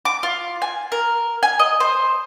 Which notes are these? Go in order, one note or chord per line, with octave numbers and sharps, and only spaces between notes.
D6
F4
G#5
A#4
G#5
D#5
C5